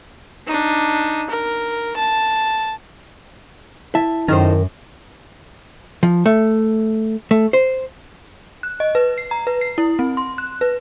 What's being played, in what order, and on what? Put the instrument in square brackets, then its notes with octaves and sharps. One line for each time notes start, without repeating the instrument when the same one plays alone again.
[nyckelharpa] D4 D#4
A#4
A5
[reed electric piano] E4 A5 [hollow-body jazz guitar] E5
[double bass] F#2 [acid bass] D#3 [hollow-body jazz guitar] D#4 A4 C5
[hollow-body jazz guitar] F3
A3
A3
C5
[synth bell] F#6
D#5
B4
C7
A#5
B4
C7
E4
C4
C6
F#6
B4